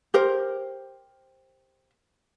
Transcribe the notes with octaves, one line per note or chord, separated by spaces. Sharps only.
G4 A#4 C5